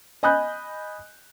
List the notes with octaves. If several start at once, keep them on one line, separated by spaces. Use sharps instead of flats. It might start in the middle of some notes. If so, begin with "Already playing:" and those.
D#5 G#5 B5 D#6 F#6 G6